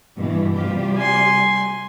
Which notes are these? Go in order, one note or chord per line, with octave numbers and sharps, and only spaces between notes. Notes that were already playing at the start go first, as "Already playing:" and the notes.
G2 B2 E3
C3 G3 F4 G4
G#5 C6